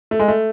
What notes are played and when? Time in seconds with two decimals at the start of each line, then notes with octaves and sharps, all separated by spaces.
0.11 A3
0.19 G#3
0.28 A3